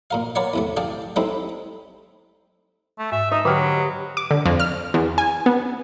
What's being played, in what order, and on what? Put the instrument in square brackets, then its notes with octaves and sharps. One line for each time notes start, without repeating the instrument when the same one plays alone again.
[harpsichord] A#2 A#4 F5
A#4 B4 C#5 D5 F5 F#5
E2 C3 A3
G#4 D5 F5 G5 A5
G3 G#3 C4 D#4 E4 A4
[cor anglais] A3
[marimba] G#2 [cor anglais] E5
[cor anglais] D#4 [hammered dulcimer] D#5
[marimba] D3 G5 F6 [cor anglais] F#3 [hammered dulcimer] G4 B4
[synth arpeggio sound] D6
D3
F2
F6
E2
G#5
B3